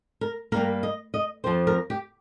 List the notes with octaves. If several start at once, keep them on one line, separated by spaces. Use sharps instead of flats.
A#4
G2 G3 A#3 A#4
D#5
D#5
F2 F3 C4 C5
A#4
G4